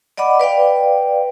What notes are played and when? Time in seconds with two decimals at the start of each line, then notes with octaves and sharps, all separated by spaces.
0.17 D5 D#5 F#5 B5 D6
0.40 B4 D5 F5 G5